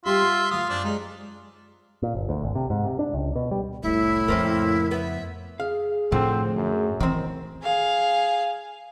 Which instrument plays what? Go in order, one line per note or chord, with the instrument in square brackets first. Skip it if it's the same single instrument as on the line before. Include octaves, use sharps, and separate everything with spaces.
[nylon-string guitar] G3 G4 [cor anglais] F4 [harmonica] E5 C6
[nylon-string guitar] F#5
[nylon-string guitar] D2 F#3 [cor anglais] F4 [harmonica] F5 D#6
[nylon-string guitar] F#2 [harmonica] C4 D4
[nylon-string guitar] G#3 D5 [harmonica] D#4
[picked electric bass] A#2
G1
D2
G#1
C3
G#2
C3
D4
C#2
B2
G3
[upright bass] F1 C2 [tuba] A2 [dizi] E4
[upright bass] F2 C#3 [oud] A#3 C4 C#4
[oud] B3 [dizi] E5
[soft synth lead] G#4 [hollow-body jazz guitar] F5
[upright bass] A2 [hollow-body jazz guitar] D3 F3 [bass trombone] C4
[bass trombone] F#2
[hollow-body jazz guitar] D#3 C4 [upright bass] E3
[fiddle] G#4 F5